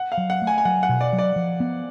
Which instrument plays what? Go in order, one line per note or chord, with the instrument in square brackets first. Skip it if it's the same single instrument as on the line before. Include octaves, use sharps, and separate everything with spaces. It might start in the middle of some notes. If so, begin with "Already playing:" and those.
Already playing: [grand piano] F#5
F5
[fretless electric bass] F#3
[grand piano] F#5
[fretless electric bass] A3
[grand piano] G#5
G#5
[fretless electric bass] F#3 [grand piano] F#5
[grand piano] F#5
[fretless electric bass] B2
[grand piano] D5
[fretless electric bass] F#3
[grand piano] D5
[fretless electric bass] F3
B3